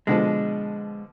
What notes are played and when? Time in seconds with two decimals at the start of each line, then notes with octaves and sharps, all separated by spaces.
0.07 B2 D3 F3 G#3